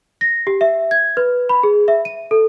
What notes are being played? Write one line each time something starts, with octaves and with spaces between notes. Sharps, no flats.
A#6
G4
E5
G#6
B4
B5
G#4
E5
D#7
A4